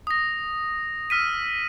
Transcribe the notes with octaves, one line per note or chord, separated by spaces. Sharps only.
D#6 A#6
E6 F6 B6 D#7